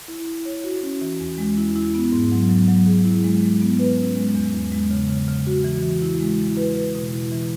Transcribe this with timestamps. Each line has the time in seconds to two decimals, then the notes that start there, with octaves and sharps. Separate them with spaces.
0.08 E4
0.27 E4
0.45 C#5
0.64 F#4
0.83 C#4
1.01 E3
1.20 E2
1.38 G#3
1.58 E4
1.76 E4
1.95 B3
2.12 G#2
2.32 F#3
2.49 F#3
2.68 F#3
2.86 G#4
3.05 E4
3.24 G#3
3.43 G#3
3.61 B3
3.79 B4
3.99 C#4
4.16 G#3
4.34 E2
4.54 E2
4.72 G#3
4.91 C#3
5.10 C#3
5.28 C#3
5.47 F#4
5.64 E3
5.83 E3
6.02 E4
6.20 G#3
6.38 E4
6.57 B4
6.76 B4
6.95 B2
7.13 E4
7.32 E3